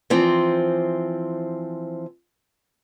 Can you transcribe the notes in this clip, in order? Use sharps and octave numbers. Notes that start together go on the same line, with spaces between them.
E3 F3 C4